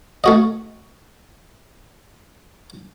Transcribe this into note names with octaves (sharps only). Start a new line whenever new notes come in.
A3 F#4 D#5